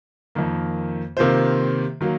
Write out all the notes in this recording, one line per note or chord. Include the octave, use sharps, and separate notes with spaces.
F2 D#3 A#3
C3 D#3 A#3 F4 C5
D#3 F#3 A#3